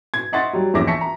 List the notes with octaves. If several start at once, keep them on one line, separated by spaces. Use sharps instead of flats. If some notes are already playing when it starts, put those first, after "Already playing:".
G#6
D#5 E5 F#5 C6 C#6 A6
F#3 G3
A#1 E2 C#4 E5 D6 A#6
E5 A5 C#6 A#6 B6 C#7
A#5